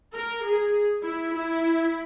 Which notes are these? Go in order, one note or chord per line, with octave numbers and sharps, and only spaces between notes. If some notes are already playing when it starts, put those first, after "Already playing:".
A#4
G#4
E4
E4